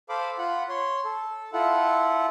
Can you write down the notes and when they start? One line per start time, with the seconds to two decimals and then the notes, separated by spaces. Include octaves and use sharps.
0.09 A4 C5 F5 B5 D6
0.38 F4 F#5 B5
0.69 C#5 C6
1.05 A4
1.53 E4 F4 A4 F#5